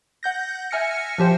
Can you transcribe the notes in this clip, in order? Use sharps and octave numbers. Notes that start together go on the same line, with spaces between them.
F#5 G6 A#6
E5 G#5 F6 A#6 C#7
F3 G4 C5 G5